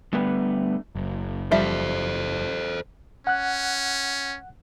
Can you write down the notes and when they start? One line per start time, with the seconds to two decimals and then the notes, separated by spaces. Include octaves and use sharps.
0.13 D3 G3 A3 B3 B4
0.95 F#1
1.51 F3 G3 A4 C5 E5
3.27 C#4 F#5 F#6